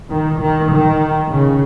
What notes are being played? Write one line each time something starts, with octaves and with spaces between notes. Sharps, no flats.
D#3
D#3
D#3
C#3